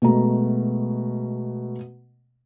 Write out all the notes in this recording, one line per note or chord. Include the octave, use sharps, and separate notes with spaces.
B2 G#3 A3 A#5